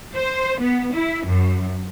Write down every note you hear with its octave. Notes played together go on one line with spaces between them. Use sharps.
C5
B3
E4
F#2